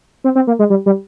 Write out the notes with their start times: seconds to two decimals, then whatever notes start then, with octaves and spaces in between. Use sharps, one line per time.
0.24 C4
0.35 C4
0.47 A#3
0.59 G#3
0.70 G3
0.86 G3